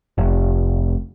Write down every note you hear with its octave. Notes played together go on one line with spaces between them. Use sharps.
F1